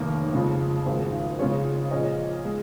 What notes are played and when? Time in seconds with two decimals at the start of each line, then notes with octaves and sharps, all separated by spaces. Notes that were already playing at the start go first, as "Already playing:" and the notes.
Already playing: F1 D#2 D#3 A#3
0.33 F2 C#3 G#3 F4
0.86 G#1 G#2 F3 G#3
1.39 C#3 G#3 F4 G#4 C#5
1.91 A#2 F3 C#4 G#4 D#5
2.45 G#3